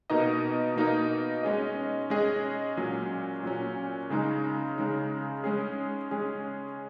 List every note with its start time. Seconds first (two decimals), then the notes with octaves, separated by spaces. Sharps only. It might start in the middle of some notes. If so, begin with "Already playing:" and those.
0.10 B2 A#3 D#4 A#4 D#5
0.76 B2 A#3 D#4 A#4 D#5
1.43 G#3 C#4 G#4 D#5
2.10 G#3 C#4 G#4 D#5
2.77 A#2 F#3 C#4
3.43 A#2 F#3 C#4
4.10 C#3 G#3 D#4
4.78 C#3 G#3 D#4
5.44 G#3 C#4 G#4
6.11 G#3 C#4 G#4